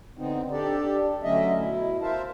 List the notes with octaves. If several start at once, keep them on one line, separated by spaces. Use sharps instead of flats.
D3 B3 C4 D#4
D4 G4 A4 D5
D3 F#3 A3 C#4 D#5 E5
B2 E4
A#4 C5 E5 F5 A5